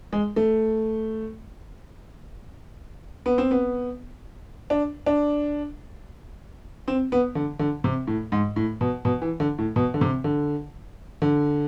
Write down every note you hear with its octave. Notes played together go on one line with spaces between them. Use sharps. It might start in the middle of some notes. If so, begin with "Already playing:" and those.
G#3
A3
B3
C4
B3
D4
D4
C4
B3
D3
D3
C3
A2
G#2
A2
B2
B2
E3
D3
A2
B2
D3
C3
D3
D3